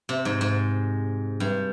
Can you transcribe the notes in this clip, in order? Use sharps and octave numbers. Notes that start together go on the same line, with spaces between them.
C3
G#2
G#2
G2